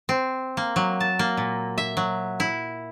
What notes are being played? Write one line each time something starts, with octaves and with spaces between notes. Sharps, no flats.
C4
A#3
F#3
A5
A#3
A#2
E5
F#3
E4